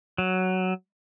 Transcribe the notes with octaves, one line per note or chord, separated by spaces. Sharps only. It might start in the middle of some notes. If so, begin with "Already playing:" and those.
F#3